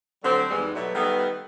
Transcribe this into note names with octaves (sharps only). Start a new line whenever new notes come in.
D3 F#3 G3 A3 C4 D4
E2 G#2 D#3 E3 G3 G#3
B2 F#3 G3 A3
D#3 G3 A3 B3